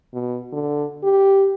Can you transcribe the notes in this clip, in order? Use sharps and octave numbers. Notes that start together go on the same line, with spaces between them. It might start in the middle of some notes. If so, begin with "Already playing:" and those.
B2
D3
G4